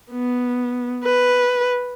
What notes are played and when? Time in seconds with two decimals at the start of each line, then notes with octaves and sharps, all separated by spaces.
0.11 B3
1.04 B4